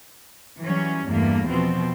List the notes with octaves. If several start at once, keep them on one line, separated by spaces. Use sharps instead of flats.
E3 F#3 G3 C#4
E2 G2 A3 A#3
B2 F3 C4